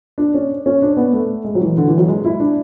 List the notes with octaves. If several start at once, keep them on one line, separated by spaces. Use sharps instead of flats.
D4
C#4
C#4
D4
B3
A3
G#3
F#3
E3
D3
E3
F#3
G#3
E4
D4